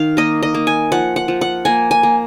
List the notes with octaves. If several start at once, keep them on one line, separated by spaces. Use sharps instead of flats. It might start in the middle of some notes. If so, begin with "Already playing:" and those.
Already playing: D#3 F5
A#3 D#5
D#5
A#3
G#5
F3 F#5
F#5
F3
F#5
A#3 G#5
G#5
A#3